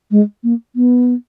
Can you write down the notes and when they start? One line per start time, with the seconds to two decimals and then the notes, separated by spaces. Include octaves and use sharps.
0.11 G#3
0.44 A#3
0.76 B3